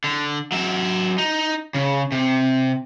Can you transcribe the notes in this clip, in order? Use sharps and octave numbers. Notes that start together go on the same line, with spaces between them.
D3
F#3 E5
D#4
C#3
C3